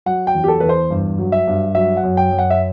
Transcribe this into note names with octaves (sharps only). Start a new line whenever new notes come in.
F#3 F#5
G5
E2
G4
A4
E2 B4
C5
G2
F#3
E5
G2
F#3 E5
F#5
F#2
G5
F#2
F#5
E5